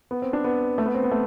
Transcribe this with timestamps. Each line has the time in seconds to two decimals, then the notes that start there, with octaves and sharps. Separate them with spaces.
0.11 B3
0.22 C4
0.33 D4
0.44 B3
0.78 A3
0.86 B3
0.95 C4
1.03 B3
1.11 A3